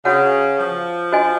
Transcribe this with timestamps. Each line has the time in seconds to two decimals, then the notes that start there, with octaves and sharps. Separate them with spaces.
0.05 C#3 F#4 C#5 F#5
0.59 F3
1.12 F#4 C5 D#5 G#5 C6